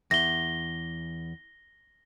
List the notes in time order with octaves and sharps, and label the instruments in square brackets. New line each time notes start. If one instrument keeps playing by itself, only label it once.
[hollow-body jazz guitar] E2 [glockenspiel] A#6 G7